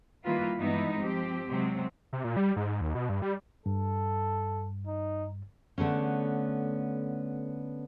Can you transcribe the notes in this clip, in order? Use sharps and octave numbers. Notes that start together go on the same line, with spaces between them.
D#3 G3 A#3 E4 F4 B4
G2 E3 G#3 B3 D#4 E4
F3 C4 G4
C3 F#3 G#3 C4
C3
A#2
G3
G#2
D#2
B2
G2
G3
G2 A4
D#4
D3 A3 B3 C#4